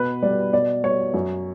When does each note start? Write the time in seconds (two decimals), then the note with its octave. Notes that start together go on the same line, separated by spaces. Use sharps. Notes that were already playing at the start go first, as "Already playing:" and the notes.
Already playing: B2 B4
0.23 G3 D5
0.53 B2 D5
0.84 G3 C#5
1.14 F#2